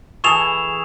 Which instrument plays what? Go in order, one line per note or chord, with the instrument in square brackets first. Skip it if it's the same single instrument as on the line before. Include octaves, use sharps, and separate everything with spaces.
[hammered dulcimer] E3 G#4 A4 [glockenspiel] C#6 E7 F7